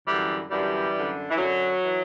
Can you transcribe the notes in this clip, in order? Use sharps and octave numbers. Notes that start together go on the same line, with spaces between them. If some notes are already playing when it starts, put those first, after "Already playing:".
F#2 D3 E3 G3
F#2 D3 E3 G3
F#2 D3
E3
F#2 D3 F#3
E3